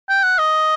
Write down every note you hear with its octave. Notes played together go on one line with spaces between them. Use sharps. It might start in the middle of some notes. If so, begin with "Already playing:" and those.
G5
F#5
D#5